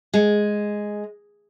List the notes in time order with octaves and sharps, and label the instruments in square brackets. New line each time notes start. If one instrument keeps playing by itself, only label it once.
[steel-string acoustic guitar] G#3